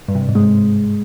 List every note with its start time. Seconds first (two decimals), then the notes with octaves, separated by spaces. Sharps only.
0.08 G2
0.15 C3
0.22 G2
0.29 G#2
0.35 G#3